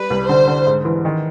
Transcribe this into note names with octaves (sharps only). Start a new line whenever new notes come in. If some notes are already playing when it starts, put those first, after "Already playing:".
Already playing: G3 B4
C2
D3 C5
D3
G#2
E3
D#3